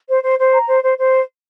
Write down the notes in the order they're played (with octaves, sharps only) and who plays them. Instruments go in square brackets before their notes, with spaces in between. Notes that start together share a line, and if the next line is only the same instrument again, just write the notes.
[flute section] C5
C5
C5
A#5
C5
C5
C5